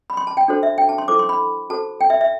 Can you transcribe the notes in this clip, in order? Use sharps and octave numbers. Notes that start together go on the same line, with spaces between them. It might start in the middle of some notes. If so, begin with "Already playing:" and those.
B5
C6
A5
G5
D4 F#4 A4 C5
E5
G5
A5
C6
E4 A4 C5 D6
C6
B5
F#4 A4 C5 A5
G5
E5
E5